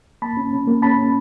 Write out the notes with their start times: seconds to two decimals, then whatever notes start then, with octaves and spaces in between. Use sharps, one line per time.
0.22 A#3 A5 B5
0.37 C#4
0.53 C#4
0.67 A#3
0.82 C#4 A5 B5
0.98 C#4